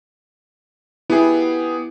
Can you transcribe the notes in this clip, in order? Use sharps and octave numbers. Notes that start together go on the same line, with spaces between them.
B3 E4 G4 G#4